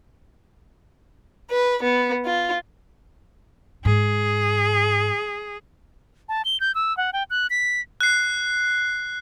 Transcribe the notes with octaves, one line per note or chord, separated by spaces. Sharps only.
B4
B3
F4
G#2 G#4
A5
G7
G6
E6
F#5
G5
F#6
B6
F#6 C7